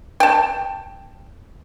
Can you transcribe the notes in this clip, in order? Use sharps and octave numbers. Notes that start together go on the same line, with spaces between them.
G5 A5